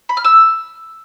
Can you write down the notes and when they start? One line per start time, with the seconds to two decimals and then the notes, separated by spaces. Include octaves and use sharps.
0.09 B5
0.17 F6
0.25 E6